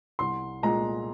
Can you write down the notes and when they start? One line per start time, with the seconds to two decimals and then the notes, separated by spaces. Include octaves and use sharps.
0.19 C2 C6
0.63 A#2 G#3 A#5